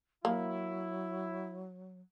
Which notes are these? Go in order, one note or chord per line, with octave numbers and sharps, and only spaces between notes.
F#3 A#3 E4